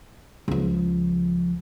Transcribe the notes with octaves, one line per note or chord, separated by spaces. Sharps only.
C#2 F3